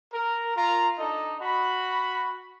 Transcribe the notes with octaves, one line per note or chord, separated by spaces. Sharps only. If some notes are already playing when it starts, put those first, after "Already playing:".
A#4
F4 A#4 F5 A#5
D4 D#4 A4 D#5
F#4 B5